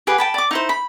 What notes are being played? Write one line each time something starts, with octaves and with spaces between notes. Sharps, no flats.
G4 G#4 B4 F#5
G5 A5 B5
D5 D6
D#4 E4 C5
B5